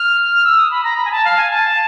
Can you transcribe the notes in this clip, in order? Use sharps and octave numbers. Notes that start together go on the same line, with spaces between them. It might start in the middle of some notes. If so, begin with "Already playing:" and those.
Already playing: F6
E6
D#6
B5
A#5
B5
G#5
A5
F5
G#5
A5